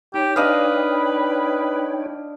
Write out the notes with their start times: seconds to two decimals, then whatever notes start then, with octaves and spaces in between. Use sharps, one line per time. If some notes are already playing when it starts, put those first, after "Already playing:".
0.14 D#4 G4 C#5 G5
0.36 D4 B4 D#5 F5